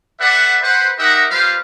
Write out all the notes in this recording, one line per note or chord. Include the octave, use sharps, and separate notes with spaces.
A4 B4 D5 E5 F#5
B4 C5 F#5
D#4 G4 A#4 D#5 E5 F#5
G3 F4 B4 C5 F5